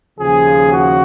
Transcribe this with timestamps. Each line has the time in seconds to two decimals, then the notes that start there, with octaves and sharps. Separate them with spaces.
0.19 D#2 C#3 F3 G#4
0.73 F#4